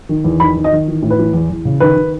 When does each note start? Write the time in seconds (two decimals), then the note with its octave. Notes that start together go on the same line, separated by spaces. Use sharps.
0.09 D#3
0.24 E2
0.40 D#3 B5
0.56 D#3
0.64 D#5
0.72 D#3
0.88 E3
1.02 A2
1.10 B4
1.19 E3
1.34 E2
1.50 E2
1.65 C#3
1.80 D#3 B4
1.96 D#3